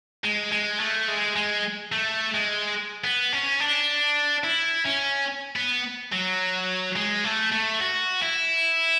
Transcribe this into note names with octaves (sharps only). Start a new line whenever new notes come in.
G#3
G#3
A3
G#3
G#3
A3
G#3
B3
C#4
D4
E4
C#4
B3
F#3
G#3
A3
A3
F#4
E4